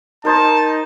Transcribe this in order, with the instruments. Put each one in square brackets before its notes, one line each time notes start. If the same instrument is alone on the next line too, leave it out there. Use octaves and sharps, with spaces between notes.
[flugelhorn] D#4 [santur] A#4 C5 D#5 [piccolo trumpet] A5